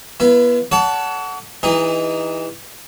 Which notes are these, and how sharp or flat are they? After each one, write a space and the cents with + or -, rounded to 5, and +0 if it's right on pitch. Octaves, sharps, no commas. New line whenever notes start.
B3 -25 E4 +40
A4 +0 C#5 +45 F#5 +0
E3 +0 D#4 +0 G#4 -45